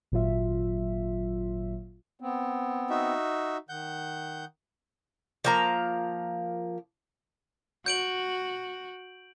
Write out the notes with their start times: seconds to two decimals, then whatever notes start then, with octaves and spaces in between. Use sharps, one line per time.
0.12 G#1 A#2 F#3 F4 E5
2.20 B3 C4
2.90 D#4 F#4 E5
3.69 D#3 F#5 G6
5.44 F3 A#3 A#5
7.86 F#4 G6 D7 F#7